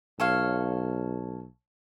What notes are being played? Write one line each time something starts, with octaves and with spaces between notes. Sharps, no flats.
B1 A4 C#5 F5